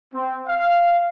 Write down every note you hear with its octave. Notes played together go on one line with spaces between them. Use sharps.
C4
F5